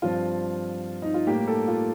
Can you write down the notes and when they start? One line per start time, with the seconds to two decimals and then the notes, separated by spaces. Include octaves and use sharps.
0.02 G2 F3 C4 F4
1.02 D#4
1.14 F4
1.27 A2 G3 A#3 G4
1.47 A4
1.68 F4